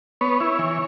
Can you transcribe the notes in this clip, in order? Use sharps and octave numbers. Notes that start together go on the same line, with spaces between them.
B3 C#5
E4
E3